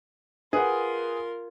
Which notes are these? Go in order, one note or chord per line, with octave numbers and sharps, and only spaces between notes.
F4 G#4 A#4 B4 F#5